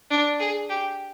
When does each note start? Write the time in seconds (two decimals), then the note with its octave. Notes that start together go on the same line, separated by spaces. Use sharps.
0.10 D4
0.40 G#4
0.69 G4